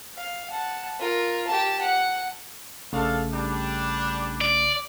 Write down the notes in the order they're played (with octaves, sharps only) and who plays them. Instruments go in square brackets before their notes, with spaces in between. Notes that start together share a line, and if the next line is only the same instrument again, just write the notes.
[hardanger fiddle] F5
F#5 A5
F4 A#4
G4 A5
F#5
[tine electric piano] A#1 C#3 A3 [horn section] D4 A4 F5
[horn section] G3 D4
[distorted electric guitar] D5